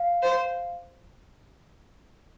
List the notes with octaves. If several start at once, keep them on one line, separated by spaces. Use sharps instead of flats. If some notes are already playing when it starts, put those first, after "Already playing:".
Already playing: F5
C5